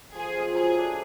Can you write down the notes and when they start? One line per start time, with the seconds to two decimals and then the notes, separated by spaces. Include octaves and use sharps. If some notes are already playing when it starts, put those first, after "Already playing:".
0.15 F3 G#4
0.35 G#3 C4 F4
0.55 F#3 G#4
0.75 A3 D4